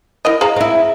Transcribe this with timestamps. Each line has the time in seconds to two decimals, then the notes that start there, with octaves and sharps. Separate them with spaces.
0.25 E4 A#4 D#5
0.41 G#4 F5 A#5
0.56 C4 E4